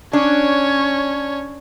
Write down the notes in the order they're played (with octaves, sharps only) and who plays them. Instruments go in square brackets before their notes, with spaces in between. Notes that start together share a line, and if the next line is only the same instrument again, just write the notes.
[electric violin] C#4 C#5 [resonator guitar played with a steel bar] D4